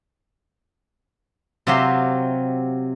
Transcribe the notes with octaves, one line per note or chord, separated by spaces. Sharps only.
C3 F#3 F4 G4 E5 C6